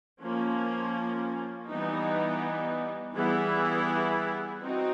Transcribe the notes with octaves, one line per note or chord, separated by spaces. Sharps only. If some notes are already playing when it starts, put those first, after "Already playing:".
F3 A#3 C#4
E3 G3 B3 D#4
E3 G3 B3 E4 G#4
C4 D#4 F#4